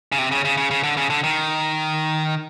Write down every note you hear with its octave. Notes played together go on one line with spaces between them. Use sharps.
C#3
C3
C#3
C#3
C#3
C#3
D3
C#3
D3
D#3